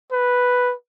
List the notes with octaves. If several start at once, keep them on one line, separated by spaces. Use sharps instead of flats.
B4